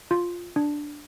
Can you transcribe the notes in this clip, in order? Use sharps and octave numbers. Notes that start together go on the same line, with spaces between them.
F4
D4